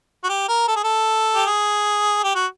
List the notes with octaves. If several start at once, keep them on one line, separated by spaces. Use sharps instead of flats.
F#4
G4
A#4
A4
G#4
A4
G4
G#4
G4
F#4